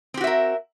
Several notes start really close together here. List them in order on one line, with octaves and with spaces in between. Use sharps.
C4 G4 F#4 E5 A#4